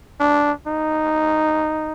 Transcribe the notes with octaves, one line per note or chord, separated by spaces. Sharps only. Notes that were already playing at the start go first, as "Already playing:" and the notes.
D4
D#4